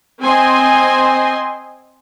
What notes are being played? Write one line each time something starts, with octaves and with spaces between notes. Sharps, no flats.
C4 C5 D#5 G#5 C6